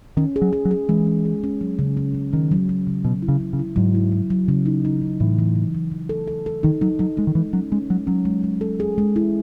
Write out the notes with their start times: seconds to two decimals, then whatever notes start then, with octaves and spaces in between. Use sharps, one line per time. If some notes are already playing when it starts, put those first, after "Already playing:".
0.17 D#3 C#4
0.36 G#4
0.42 F#3
0.53 G#4
0.65 F#3
0.71 G#4
0.89 E3 G#3
1.07 C#4
1.25 G#4
1.44 C#4
1.61 F#3
1.79 C#3
1.97 C#4
2.14 C#3
2.33 D#3 C#4
2.51 F#3
2.69 F#3
2.87 C#3
3.04 B2 F#3
3.22 E4
3.28 C#3
3.40 F#3
3.53 C#3
3.59 E4
3.76 G#2 F#3
3.94 E4
4.12 F#3
4.30 F#3
4.48 C#3
4.66 D#4
4.85 D#4
5.02 C#3
5.20 A2 E3
5.39 E3
5.56 C#3
5.75 E3
5.92 E3
6.09 A4
6.28 A4
6.46 A4
6.63 D#3 D#4
6.81 F#3 D#4
6.99 F#3 D#4
7.17 G#3 D#4
7.27 D#3
7.35 E3 G#3
7.53 F#3 C#4
7.72 G#3 C#4
7.90 F#3 G#3
8.07 F#3 C#4
8.25 G#3
8.44 G#3
8.61 A4
8.80 G#4
8.98 G#3
9.16 E4